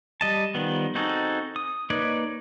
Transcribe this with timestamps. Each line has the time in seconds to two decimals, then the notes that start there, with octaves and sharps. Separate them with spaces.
0.21 G3 D#5 A5
0.55 D#3 F3 G3 B3
0.95 C4 D#4 F#4 G#4 A4
1.56 D#6
1.90 A#3 D#4 B4 C#5 D5